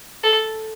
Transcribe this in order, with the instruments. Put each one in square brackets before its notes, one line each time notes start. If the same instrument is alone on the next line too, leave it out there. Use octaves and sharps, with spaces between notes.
[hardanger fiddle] A4